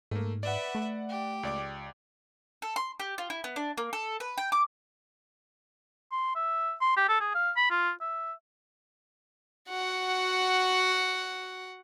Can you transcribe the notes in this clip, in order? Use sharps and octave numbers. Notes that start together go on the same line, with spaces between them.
G#2 A3 A#3
B4 D5 E5 F#5
A3
G4
C#2 D5 D6
A4
C6
G4
F4
E4
B3
D4
A#3
A4
B4
G5
D6
C6
E5
C6
G4
A4
G#4
F5
B5
F4
E5
F#4 F#5